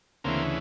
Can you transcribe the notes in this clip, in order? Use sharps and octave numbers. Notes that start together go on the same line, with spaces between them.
D2 C#3 E3 A#3 C4